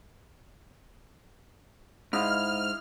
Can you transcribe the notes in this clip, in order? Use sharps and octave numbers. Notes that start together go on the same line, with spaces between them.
G#2 E4 D#5 F5 F6